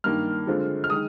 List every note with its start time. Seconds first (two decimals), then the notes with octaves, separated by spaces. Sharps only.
0.04 G2 D#3 A#3 F6
0.47 D3 G#3 C4 F4
0.84 F6
0.90 D#3 G#3 D#6